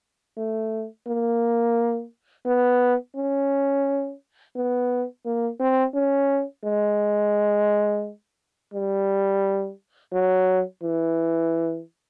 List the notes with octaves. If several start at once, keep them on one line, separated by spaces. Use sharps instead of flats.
A3
A#3
B3
C#4
B3
A#3
C4
C#4
G#3
G3
F#3
E3